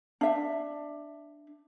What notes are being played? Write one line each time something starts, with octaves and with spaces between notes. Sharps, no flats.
D4 E5